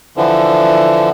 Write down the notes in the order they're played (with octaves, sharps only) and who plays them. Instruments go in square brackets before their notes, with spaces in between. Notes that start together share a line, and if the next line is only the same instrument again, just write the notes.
[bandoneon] D3 E3 F3